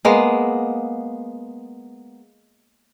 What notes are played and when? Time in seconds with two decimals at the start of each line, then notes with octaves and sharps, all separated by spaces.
0.05 G#3 A#3 B3